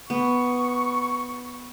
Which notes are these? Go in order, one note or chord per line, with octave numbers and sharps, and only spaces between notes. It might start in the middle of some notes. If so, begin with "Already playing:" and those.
B3 C#6